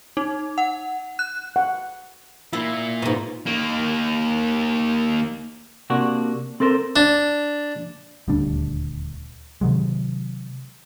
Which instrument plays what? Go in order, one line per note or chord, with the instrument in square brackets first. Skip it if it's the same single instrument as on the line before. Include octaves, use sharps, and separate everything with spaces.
[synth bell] D#4
F#5
F#6
[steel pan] F#5
[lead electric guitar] A#3 F4 [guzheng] E4
[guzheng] G#2 B2
[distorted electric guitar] D#3 A#3
[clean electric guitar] C3 A#3 D4 F#4
C4 A4 A#4 C5
[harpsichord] D4
[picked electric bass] D#1 D2 G3 D4
C3 D#3 F#3 G#3